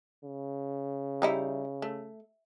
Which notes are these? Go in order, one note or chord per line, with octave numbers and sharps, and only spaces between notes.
C#3
G3 D#4 E4
A3